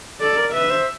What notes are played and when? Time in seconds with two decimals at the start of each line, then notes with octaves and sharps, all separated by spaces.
0.20 A4 D5
0.37 A#4
0.53 B4 E5
0.70 C5